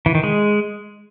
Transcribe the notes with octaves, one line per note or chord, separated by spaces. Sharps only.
E3
D#3
G#3